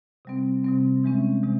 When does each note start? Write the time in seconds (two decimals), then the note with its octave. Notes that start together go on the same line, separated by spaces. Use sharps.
0.25 C3 G3 C4
0.65 C3 G3 C4
1.04 C3 E3 G#3 C#4
1.43 C3 E3 G#3 C#4